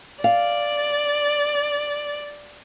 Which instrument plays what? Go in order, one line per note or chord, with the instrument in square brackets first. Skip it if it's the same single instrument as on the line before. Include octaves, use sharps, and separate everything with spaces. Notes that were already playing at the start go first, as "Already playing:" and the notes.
[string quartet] D5 [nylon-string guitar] F5